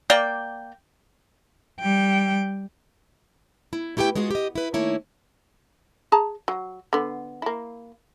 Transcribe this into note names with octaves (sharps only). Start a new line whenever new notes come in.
A#3 A#4 D5 G5
G3 G5
E4
A3 E4 G4 B4 G5
G#3 F4 F#4 G#4 F#5
G4 D#5
E4 B4
D#3 A3 A#3 D#4 E4 C#5
G#4 A5 A#5
F#3
D3 B3
A#3 E4